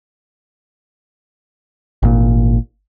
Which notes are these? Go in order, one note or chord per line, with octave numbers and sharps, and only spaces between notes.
G#1 A#2